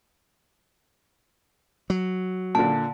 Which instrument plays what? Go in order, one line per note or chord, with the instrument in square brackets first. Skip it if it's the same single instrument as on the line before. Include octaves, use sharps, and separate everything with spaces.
[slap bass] F#3
[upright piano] A#2 D3 [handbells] A5